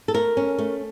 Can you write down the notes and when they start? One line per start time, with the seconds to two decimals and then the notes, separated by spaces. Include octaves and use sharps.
0.08 A4
0.14 A3 A#4
0.37 C#4
0.58 A3